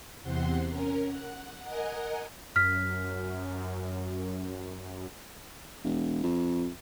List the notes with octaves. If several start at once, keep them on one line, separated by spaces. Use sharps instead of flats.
E2 C3 C4 F#5 C6
C#4 A#4
F#5
A#4 D#5 F#5 G#5
F#2 F6 B6
E1
F2